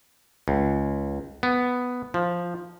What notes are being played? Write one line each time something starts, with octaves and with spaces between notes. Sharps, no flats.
C#2
B3
F3